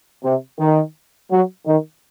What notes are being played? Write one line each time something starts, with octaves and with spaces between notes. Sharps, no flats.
C3
D#3
F#3
D#3